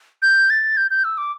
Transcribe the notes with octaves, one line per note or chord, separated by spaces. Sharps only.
G6
A6
G6
G6
E6
D6